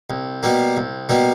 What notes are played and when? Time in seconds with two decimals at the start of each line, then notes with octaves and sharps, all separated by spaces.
0.10 C2
0.43 B2 G3 A#3
0.77 C2
1.09 B2 G3 A#3